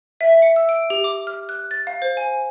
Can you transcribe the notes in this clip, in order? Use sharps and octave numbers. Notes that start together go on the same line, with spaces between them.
E5
C#7
E6
D7
G4
D6
F6
F#6
A6
F5
C5
G#5